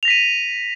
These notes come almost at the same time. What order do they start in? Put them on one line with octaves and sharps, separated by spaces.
F7 A#6 B6 D#7